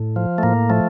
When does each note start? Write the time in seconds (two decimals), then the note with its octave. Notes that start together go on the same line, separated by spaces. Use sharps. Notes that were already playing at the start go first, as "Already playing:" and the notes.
Already playing: A2
0.16 F3
0.38 A3
0.43 A2 A#3
0.70 F3 A3